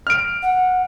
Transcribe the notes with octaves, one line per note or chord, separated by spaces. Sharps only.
F6 D7
F#5